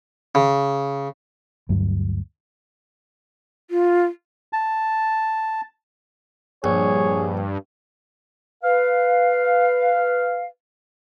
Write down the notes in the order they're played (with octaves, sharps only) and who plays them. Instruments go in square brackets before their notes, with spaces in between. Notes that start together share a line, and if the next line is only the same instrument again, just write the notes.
[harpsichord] C#3
[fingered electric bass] D2 G2 F#3
[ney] F4
[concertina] A5
[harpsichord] A#1 [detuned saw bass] G2 [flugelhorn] G#4 [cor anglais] C#5
[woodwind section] B4 F5